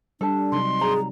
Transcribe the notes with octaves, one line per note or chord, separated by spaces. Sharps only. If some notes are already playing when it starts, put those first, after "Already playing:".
G3 D4 A4 A5
C3 F#3 D#4 C6
G#4 A#5